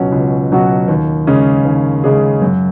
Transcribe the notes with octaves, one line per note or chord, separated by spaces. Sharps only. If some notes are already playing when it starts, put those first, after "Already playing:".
Already playing: C#2 B2 F#3 C#4 F#4
C#2
B2 F#3 C#4 F#4
D#2
C#3 G#3 C#4 G#4
D#2
C#3 G#3 C#4 G#4
F#2